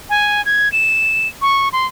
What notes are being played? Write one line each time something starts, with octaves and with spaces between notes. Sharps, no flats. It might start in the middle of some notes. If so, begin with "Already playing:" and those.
G#5
G#6
E7
C#6
C6